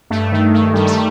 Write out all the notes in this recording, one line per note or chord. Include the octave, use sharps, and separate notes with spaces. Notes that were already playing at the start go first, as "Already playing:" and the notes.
G2 A3
D#3
D#3
G2 G3
A3